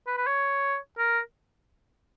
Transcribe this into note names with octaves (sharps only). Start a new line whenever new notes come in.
B4
B4
C#5
A#4